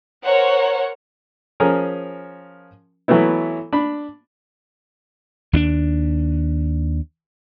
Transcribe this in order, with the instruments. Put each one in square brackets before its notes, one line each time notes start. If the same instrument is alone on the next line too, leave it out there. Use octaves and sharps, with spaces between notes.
[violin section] A#4 C5 C#5 F#5
[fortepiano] F3 C#4 G#4 A#4
E3 F#3 A3 B3 E4
D4 B5
[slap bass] D#2 C#4 D4